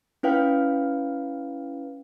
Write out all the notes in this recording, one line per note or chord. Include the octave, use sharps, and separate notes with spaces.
C#4 E4 B4 F5 G5